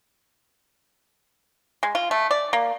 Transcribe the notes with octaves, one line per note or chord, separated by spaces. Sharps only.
G#3
F4
A3
D5
A#3